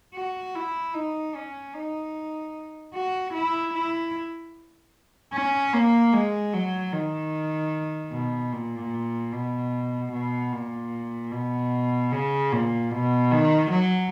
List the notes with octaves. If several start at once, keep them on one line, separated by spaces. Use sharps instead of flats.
F#4
E4
D#4
C#4
D#4
F#4
E4
E4
C#4
A#3
G#3
F#3
D#3
B2
A#2
B2
B2
A#2
B2
C#3
A#2
B2
D#3
F#3